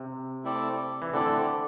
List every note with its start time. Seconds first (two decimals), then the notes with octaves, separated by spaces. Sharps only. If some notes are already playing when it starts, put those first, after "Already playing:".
Already playing: C3
0.44 A3 C4 E4 A4 D5
1.02 E3
1.13 D3 A3 C4 E4 A4 D5